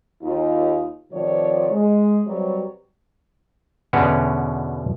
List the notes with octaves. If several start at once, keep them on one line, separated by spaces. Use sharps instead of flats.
D#2 D#4 F4
A2 C3 D#3 F3 C#5 D5
G#3
C3 F#3 G3 G4 B4 C#5
E2 B2 D3 C#4 F#4 B4